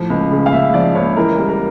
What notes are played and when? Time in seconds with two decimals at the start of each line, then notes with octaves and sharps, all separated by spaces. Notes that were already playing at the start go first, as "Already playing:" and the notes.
Already playing: A2 F3
0.10 C#2
0.31 C#3
0.46 F5
0.52 C#2 E5
0.74 F3 D5
0.95 C#2 C#5
1.16 E3 A#4
1.38 G3
1.49 A#4